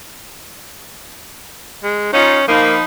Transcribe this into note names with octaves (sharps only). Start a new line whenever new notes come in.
G#3
C#4 D#4 F4
F3 A#3 D#4 B5